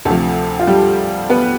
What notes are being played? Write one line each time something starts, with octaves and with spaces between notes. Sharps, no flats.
D2 C3 F3 A3 A4
F4
G3 G4
B3 B4